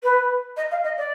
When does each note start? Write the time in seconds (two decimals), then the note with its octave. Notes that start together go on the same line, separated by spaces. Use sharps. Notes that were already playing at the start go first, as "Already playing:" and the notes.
0.03 B4
0.56 D#5
0.71 F5
0.84 D#5
0.98 D5